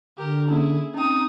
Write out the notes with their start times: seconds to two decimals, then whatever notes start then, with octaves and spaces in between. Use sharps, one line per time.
0.18 D3 G4 A#4
0.48 A#3 C#4 E4 G#4
0.94 C4 C#4 D#4 G5 D#6